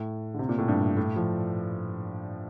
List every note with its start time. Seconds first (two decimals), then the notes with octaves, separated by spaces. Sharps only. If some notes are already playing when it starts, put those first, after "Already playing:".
Already playing: A2
0.34 D3
0.39 C3
0.49 A#2
0.58 A2
0.68 G2
0.97 A2
1.16 F3